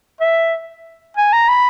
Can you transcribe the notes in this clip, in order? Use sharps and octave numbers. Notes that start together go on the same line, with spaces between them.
E5
G#5
A#5
B5